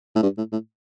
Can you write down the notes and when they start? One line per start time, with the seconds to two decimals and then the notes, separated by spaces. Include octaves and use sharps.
0.16 A2
0.23 G2
0.38 A2
0.52 A2